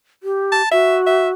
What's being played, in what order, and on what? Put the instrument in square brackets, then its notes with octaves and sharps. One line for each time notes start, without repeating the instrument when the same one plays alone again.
[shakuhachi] G4
[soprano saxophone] A5
[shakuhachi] F#4 [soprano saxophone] E5
[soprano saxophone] E5